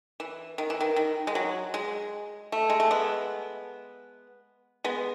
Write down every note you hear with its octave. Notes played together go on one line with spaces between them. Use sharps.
E3
D#3
E3
D#3
D#3
G#3
F#3
G#3
A3
G#3
A3
G#3 B3
G#3 B3